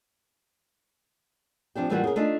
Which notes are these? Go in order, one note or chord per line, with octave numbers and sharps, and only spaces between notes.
F3 C4 D4 G4
A2 E3 G3 A#3 F4 F#4
C#3 A#4
A3 D4 D#4 F4